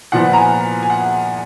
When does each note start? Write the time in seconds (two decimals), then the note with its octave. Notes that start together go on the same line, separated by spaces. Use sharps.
0.12 A#2 F3 B3 F#5
0.33 A#5
0.38 G#5
0.83 G#5
0.90 F#5